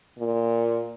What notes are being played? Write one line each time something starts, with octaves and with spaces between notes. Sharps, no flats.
A#2